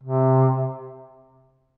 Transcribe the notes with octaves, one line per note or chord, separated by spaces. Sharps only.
C3